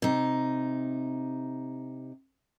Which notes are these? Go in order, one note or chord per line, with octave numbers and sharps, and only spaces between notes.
C3 D#4